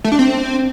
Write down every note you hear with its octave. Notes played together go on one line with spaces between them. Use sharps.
A3
D4
C4